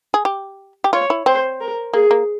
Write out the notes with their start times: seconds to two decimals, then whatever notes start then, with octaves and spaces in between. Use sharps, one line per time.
0.14 G#4
0.25 G4
0.84 G4
0.93 F4 C#5
1.10 E4
1.26 C4 C5
1.60 A#4
1.93 A#3 G#4
2.11 A#3